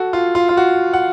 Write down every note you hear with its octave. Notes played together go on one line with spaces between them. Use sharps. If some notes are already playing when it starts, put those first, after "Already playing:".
Already playing: F#4 A4
F4
F4
F4
F#4
F#5